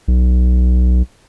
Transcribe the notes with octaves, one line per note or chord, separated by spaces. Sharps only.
B1